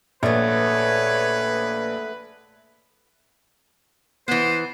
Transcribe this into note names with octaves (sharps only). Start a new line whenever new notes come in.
A#1 A3 B3 B4 C#5
E3 B3 C5